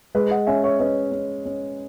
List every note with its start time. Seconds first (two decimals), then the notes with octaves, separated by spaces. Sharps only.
0.15 G#3 B4 D#5
0.31 D#5 F#5
0.47 C#4 E5 G#5
0.64 C#5 E5
0.79 C#4 B4 D#5
1.12 C#4
1.45 C#4